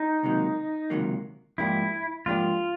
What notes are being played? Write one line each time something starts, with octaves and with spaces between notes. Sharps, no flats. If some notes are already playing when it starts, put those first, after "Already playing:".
Already playing: D#4
C#2 C3 D#3 F#3 A#3
C#2 C3 D#3 F#3 A#3
G#2 F3 A#3 D4 E4 G4
G#2 F3 A#3 D4 F4 G4